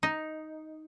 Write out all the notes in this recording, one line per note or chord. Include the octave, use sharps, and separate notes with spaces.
D#4